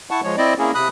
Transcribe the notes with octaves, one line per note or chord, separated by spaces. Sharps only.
E4 F#5 A5 C#6
F3 G#3 C#5
C4 E4 D5 D#5
A#3 C#4 E4 G#4
C3 B5 D#6 F#6